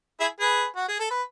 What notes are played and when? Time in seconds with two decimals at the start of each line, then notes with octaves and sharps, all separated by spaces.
0.20 E4 G#4
0.40 G#4 B4
0.76 F#4
0.88 G#4
1.00 A4
1.11 B4